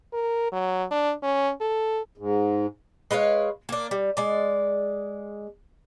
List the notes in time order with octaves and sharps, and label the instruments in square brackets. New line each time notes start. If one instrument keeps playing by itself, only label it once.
[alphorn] A#4
F#3
D4
C#4
A4
[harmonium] G#2
[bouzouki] G#3 B4 C#5 F5
A#3 D4
G3
G#3 D5